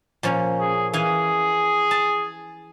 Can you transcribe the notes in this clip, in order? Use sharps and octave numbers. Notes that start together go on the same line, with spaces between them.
A#2 F3 C#4
G#4
E3 G#4 F5 G#5
A5